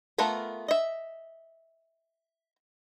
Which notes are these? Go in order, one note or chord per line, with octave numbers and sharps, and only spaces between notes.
A3 B3 F4 A#4 B4
D#5 E5